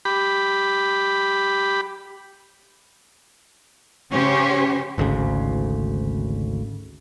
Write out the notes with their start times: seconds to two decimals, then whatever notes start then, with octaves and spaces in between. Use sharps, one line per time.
0.05 G4 B5
4.11 C#3 C#4 G4 C5 C#5
4.98 G#1 D2 G#2 C#3